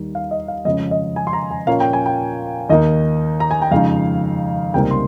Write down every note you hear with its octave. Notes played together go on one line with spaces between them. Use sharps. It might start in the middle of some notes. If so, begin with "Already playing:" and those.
Already playing: D#2 D#3 G3
F5
D#5
F5
F2 C#3 G#3 C#4 D#5
D#5
G#5
C6
A#5
G#5
A#2 F3 A#3 C#4 F5
G5
G#5
G5
D#2 D#3 A#3 D#4 D#5
A#5
G#5
G5
F2 C#3 G#3 D#4 F5
C#2 C3 G3 A#3 D#4 G5
C6